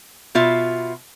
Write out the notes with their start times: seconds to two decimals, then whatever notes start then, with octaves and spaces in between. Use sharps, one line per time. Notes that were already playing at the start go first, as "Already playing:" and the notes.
0.35 B2 F4 E5